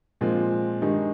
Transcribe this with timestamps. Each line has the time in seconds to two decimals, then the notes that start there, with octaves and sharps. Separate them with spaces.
0.21 A#2 F3 G#3 C4 F4
0.82 G2 D#3 G#3 D#4